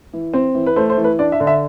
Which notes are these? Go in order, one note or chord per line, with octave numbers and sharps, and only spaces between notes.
E3
C4
E3
B4
A3 C5
C5
E3
B4
D4 D5
E5
D3
E5